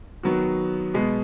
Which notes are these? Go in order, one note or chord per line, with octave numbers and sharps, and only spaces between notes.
D#3 F#3 B3 F#4
B2 G#3 B3